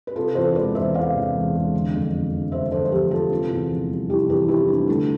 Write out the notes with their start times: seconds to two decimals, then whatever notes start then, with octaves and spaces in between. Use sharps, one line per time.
0.07 B4
0.16 C3 F4 A4
0.35 E2 A4 C5
0.55 E1 B4 D5
0.75 E1 C5 E5
0.94 C3 D5 F5
1.15 E2
1.35 E1
1.54 E1
1.74 D3
1.94 F2
2.12 F1
2.33 F3
2.52 D3 C5 E5
2.71 F2 A4 C5
2.85 C5
2.91 F1 G4 B4
3.10 F3 F4 A4
3.31 C3
3.50 E2
3.70 F1
3.89 G3
4.09 C3 E4 G4
4.29 E2 G4 B4
4.43 F4
4.48 F1 E4 G4
4.68 G3 D4 F4
4.88 D3 A3